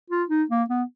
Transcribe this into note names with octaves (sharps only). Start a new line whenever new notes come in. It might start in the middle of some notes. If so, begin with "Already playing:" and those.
F4
D#4
A#3
B3